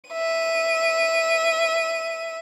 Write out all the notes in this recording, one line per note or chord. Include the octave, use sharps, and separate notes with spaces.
E5 D#7